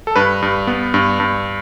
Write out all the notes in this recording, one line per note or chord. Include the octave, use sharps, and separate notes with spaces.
A4
G2 B4
G2
B3
G2
G2